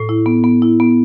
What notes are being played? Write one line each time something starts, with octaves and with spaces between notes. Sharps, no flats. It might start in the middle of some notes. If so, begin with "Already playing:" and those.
Already playing: A2
E4
B3
B3
E4
B3